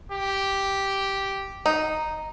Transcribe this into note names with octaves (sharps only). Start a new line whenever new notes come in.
G4
D#4